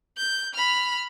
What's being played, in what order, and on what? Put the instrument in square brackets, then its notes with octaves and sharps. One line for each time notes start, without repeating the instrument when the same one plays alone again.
[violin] G6
B5 F6